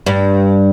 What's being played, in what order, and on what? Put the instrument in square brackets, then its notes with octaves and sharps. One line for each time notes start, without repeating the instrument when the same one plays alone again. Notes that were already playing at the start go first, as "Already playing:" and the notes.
[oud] G2